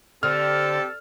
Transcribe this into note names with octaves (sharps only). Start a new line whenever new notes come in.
D3 C4 G4 A4 F6